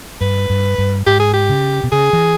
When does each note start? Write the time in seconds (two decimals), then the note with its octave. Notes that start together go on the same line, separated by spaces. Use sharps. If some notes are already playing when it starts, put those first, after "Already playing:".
0.21 G2 B4
0.50 G2
0.78 G2
1.06 G#2 G4
1.20 G#4
1.33 G4
1.49 C#3
1.84 B2
1.92 C#3 G#4
2.13 E3